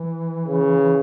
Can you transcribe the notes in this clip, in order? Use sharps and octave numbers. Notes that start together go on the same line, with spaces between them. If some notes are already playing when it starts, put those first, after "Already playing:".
Already playing: E3
C#3